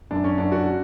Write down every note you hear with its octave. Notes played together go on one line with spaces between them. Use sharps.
F#2 D4
C#4
F#2 D4
F#4